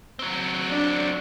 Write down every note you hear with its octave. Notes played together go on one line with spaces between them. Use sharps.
F#3 C4
D4